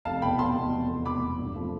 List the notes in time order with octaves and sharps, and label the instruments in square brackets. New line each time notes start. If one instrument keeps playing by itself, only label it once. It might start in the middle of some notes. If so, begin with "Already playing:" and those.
[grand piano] F1 [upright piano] F5 A5
[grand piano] E2 B2 [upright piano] G5 B5
[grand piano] F1 [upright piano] A5 C6
[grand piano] E2 B2
F1
E2 B2
[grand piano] F1 [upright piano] B5 D6
[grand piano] E2 B2
G2
F3 A3 C4